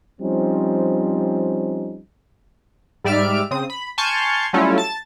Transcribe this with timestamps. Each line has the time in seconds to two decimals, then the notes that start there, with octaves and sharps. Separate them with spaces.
0.21 F3 G3 C4 C#4 D#4
3.04 G#2 G3 D5 E5 F6 D7
3.51 C#3 C4 D#6
3.70 B5
3.98 G#5 A5 C6 C#6 F6 G6
4.53 F#3 G3 A3 C#4 E4 F4
4.78 A5 A6